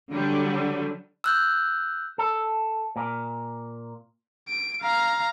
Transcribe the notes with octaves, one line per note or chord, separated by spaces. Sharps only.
D3 F#3 G3
E6 F#6 G6
A4
A#2
D7
F5 A#5